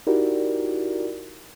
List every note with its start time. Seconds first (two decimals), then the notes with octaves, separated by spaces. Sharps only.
0.07 D#4 E4 F#4 G4 A#4 D5